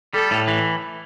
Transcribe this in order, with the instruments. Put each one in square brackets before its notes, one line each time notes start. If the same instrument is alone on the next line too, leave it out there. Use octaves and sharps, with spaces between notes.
[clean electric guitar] G3 [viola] A4
[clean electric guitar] A2
E3